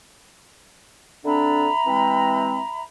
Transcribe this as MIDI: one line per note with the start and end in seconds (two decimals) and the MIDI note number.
1.25 1.67 50
1.25 1.67 60
1.25 1.67 62
1.25 2.82 76
1.25 2.82 82
1.25 2.82 83
1.86 2.60 52
1.86 2.60 56
1.86 2.60 60